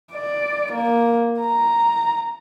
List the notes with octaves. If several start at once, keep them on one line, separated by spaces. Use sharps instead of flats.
D5
A#3
A#5